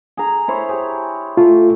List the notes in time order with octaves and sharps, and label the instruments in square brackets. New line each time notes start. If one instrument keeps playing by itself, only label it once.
[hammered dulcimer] G#4 A#5
E4 C5 C#5
G4 G#4 C#5
[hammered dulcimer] A3 [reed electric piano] F4